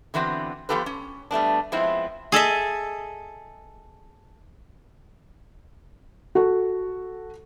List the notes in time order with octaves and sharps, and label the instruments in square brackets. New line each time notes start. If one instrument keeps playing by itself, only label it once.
[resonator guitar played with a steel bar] D3 E3 B3 C4 F#4
F3 B3 F4 G4 A4 B4
C#4
G3 A3 B3 D4
F3 G#3 B3 C4 E4
[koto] G#4 A4 D#5 E5
[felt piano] F#4 A4